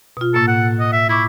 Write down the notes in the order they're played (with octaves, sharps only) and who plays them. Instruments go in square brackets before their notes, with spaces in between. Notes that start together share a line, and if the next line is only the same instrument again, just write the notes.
[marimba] B2 F4
[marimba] A2 A#3 [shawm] A4
[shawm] F#5
D#5
E5
[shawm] E4 [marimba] B5 C#6 D6